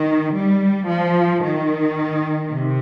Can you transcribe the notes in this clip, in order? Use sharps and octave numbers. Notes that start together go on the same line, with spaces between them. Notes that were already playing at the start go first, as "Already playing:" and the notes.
Already playing: D#3
G3
F3
D#3
C3